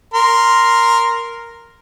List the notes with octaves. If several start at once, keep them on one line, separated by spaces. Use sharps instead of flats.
A#4 C6